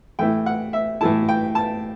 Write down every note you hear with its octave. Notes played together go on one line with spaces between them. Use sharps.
A2 E3 A3 E4 G5
F#5
E5
A2 E3 A3 E4 A5
G5
A5